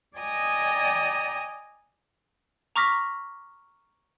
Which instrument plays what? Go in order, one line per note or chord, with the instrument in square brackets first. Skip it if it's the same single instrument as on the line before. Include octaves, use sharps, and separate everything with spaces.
[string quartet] D5 D#5 G5 G#5 A#5 D#6
[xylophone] A#5 C#6 D6 F6 A#6 B6